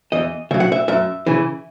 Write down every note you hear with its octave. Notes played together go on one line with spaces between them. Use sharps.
E2 D#5
C#3 F#3 E5
F#5
E5
F#2 E5
C#3 E3